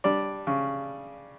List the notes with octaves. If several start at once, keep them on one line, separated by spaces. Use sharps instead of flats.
G3 D4 D5
C#3